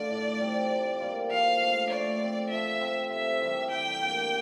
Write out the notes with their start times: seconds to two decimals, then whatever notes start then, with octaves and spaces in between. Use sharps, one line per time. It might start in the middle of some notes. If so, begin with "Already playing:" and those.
Already playing: D3 A3 D4 F4 D5
0.10 A2
0.40 G3 C4 F4
0.69 C3
1.00 G3 A#3 F4
1.30 F3 F5
1.60 A3 D4
1.90 A3 D5
2.20 C4 F4
2.50 F3 E5
2.81 C4 F4 A4
3.11 C3 E5
3.40 E3 G3
3.71 G3 G5
4.00 A#3 D4 G4